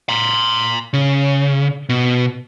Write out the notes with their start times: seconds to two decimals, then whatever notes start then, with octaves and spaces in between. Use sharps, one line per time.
0.09 A#5 C6
0.93 C#3
1.89 B2